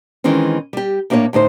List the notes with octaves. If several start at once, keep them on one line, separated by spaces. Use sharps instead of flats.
D#3 E3 G#3 C4 C#4
G3 G4
A2 A#3 D4 B4 C#5
D2 A2 D#4 C5